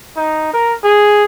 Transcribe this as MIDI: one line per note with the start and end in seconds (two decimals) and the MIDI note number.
0.16 0.50 63
0.53 0.73 70
0.83 1.24 68